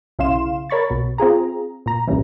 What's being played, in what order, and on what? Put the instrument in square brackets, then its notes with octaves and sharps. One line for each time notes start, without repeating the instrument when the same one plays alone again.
[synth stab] B1 C#3 E4 F5 C6 E7
A#4 C#5 B5 C#6 A6
B1 B2
C4 F4 G#4 A#5
A#2 A#5
G#1 C#2 G2 A#2 C#3 E3